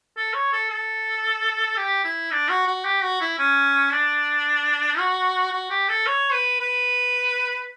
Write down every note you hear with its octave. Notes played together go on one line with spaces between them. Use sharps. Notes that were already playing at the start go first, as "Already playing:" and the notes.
A4
C#5
A4
A4
G4
E4
D4
F#4
F#4
G4
F#4
E4
C#4
D4
F#4
F#4
G4
A4
C#5
B4
B4